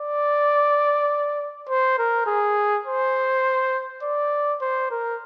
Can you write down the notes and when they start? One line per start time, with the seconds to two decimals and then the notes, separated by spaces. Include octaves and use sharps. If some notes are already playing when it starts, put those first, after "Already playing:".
Already playing: D5
1.69 C5
1.98 A#4
2.27 G#4
2.86 C5
4.03 D5
4.61 C5
4.91 A#4